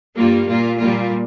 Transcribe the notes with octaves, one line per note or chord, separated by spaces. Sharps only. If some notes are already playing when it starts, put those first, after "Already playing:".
G2 G3 A#3 F4
A#2 A#3 F4
A#2 G3 A#3 F4